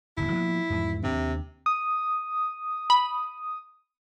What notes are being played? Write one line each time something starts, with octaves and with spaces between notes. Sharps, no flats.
D1 G1 D#2 E4
F3 A#3 B3
E2 G#2 F3
D#2 C3 D4
D#6
B5